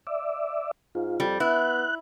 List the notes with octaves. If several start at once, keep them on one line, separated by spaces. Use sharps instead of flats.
D5 E5
G#2 F4
F2 G3
B3 E4 F#6